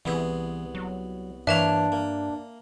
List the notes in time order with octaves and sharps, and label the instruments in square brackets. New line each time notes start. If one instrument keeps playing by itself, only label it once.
[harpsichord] C2 B3 G#4 [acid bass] E3
[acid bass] F#3
[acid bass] G2 [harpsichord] E3 A#3 C#5 [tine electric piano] D4 [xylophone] E5 A5 F7
[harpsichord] A#3